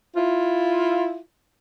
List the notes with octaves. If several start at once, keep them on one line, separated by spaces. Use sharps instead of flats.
E4 F4